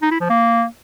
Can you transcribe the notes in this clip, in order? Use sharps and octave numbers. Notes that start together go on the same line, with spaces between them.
D#4
E4
F3
A#3